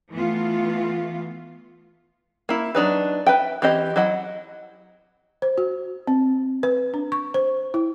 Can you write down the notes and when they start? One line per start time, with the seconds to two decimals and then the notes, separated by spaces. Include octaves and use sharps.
0.12 E3 A3 B3 F4
2.49 A#3 E4
2.75 F#3 D4 D#4 B4
3.26 B4 E5 G5
3.62 E3 C4 G4 D#5
3.96 F#3 E4 D#5 F#5
5.42 C5
5.58 F#4
6.07 C4
6.63 B4
6.94 D4
7.12 C#6
7.34 C5
7.74 E4